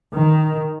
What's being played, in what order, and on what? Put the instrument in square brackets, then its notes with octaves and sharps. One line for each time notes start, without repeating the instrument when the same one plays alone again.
[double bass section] D#3